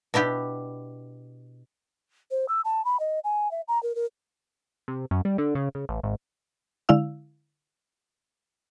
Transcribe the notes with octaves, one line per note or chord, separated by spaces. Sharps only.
B2 D4 E4 G4
C5
E6
A5
B5
D#5
G#5
E5
A#5
A#4
A#4
C3
F#2
G3
D3
C#3
C#3
A1
G#1
D3 G#3 E4 F5 E6